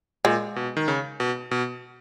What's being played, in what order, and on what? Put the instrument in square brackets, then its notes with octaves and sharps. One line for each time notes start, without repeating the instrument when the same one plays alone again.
[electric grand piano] A#2 [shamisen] G#3
[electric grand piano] B2
D#3
C#3
B2
B2